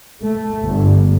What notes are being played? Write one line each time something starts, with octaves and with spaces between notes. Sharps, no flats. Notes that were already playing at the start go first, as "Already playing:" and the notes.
A3
G1